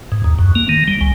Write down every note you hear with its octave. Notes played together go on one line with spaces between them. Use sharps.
G#2
D#2
F#2
A#3
D#3
G3
C#2